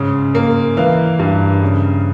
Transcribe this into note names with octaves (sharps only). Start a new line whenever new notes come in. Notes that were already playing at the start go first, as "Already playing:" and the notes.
Already playing: G#2 C#3
A#3
E3 F5
G2
C#3